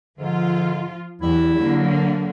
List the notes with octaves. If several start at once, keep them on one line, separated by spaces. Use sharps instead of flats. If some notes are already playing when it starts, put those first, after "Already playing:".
G#2 D3 F3 F4
E2 F#3 G3 E4
D3 F#3 A#3